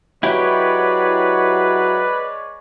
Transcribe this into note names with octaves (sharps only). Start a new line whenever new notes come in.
F#3 G#3 E4 G4 B4 C#5 D5